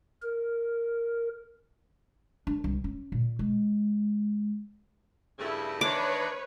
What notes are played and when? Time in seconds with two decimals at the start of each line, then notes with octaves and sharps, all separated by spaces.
0.22 A#4
2.47 D4
2.64 C2
2.84 C#4
3.12 A#2
3.39 G#3
5.39 G2 C#3 A3 E4
5.81 D#3 E3 D4 B4 C#5 D6